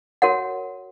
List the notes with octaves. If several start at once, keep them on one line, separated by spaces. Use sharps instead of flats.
F#4 A#4 C#5 F#5